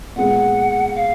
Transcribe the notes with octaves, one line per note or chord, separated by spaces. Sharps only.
A#2 G#3 B3 F#5
F5